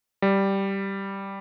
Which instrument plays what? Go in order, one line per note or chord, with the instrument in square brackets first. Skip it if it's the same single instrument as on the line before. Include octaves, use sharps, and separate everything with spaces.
[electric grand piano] G3